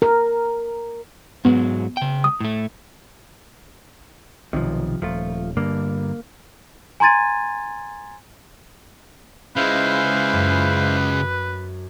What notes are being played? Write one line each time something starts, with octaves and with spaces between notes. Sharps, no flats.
A#4
G#2 F#3 G#3 B3
C#3 G5
D#6
A2 A3
B1 C3 D#3 F3
D#1 F3 A3 F4
G2 D3 A#3
G#5 A#5 C6 G#6 A6 D#7
C#3 G#3 E4 B4 C5 F5
F#2 B6